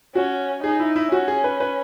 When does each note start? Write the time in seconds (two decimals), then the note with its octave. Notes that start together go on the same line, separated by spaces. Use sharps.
0.15 C#4 F#4
0.64 D#4 G#4
0.80 E4
0.96 E4
1.11 C#4 F#4
1.28 G#4
1.44 B4
1.60 B4